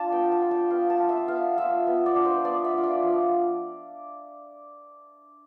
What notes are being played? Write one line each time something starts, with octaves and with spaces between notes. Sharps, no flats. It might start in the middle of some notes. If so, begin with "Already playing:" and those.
Already playing: D4 F4 A5
B3 G5
A5
D4 F4
G5
B3 F5
A5
F4
E5
B3 F5
F4 E5
B3
D5
D4 F4
C5
B3 D5
E5
D4 F4
D5
F3